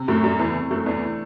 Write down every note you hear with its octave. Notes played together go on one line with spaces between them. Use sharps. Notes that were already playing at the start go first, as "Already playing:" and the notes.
Already playing: C3
F#2 A2 A3
F#2 D4
E2 E3
C3
F#2 A3
E2 D4
E3